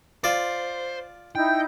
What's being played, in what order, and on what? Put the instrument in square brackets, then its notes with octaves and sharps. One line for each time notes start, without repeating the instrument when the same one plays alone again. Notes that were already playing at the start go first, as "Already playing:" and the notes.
[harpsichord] F4 D5 [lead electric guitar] C5
[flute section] D#4 E4 G6 [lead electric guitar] G5